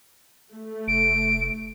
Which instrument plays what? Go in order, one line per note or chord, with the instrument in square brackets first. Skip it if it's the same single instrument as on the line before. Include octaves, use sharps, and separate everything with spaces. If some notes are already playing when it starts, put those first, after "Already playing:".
[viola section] A3
[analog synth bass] F1 [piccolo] D7